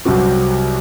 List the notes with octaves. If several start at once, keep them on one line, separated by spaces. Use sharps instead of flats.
C2 C3 F#3 C4 F#4